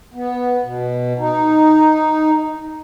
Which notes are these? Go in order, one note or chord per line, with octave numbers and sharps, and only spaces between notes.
B3
B2
D#4